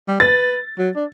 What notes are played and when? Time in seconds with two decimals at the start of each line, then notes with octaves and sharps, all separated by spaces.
0.08 G3
0.20 B4 A6
0.78 F#3
0.96 D4